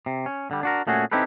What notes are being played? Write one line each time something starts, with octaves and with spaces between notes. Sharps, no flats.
C3
C#4
D3 G3
D4 F#4 A#4
A#2 A3 C#4 F#4 G#4
C4 D#4 E4 G4 A4 B4